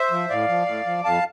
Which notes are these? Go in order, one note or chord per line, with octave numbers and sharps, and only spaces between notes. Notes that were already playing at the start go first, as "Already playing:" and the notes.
Already playing: C5 E5
F3
A2 D5 F5
F3
A2
F3
F2 F5 A5